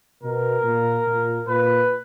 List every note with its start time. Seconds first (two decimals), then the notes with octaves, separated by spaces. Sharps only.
0.23 B2 A#4
0.64 A#2
1.06 A#2
1.47 A#2 B4